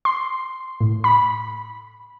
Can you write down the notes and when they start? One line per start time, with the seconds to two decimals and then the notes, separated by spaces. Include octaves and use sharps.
0.05 C6
0.80 A2
1.04 B5